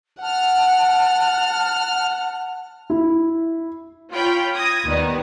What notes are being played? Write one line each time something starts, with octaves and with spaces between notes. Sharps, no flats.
F#5 A5 F6
E4
F4 C#5 G5 B5
D#6 G#6 A#6
D#2 D#3 G3 B3